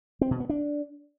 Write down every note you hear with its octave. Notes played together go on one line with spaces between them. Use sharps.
C4
B2
B3
D4